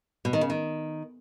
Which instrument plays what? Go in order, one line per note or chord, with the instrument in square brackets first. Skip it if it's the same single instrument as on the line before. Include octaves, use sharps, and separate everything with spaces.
[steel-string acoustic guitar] B2
D#3
C#3
D#3